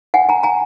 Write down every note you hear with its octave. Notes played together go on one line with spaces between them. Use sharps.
F#5 G#5
G#5 A#5
G#5 A#5